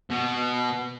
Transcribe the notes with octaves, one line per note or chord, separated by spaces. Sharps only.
B2